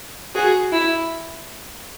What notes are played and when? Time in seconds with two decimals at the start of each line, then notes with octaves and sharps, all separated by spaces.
0.34 F#4 G#4
0.72 E4